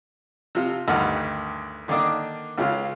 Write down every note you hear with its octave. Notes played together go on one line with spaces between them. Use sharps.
C3 F3 F4
D2 G2 D#3 G3 F#5 F6
D3 D#3 A#3 D4 D6 D#6
C#2 C#3 F4 G#4 F5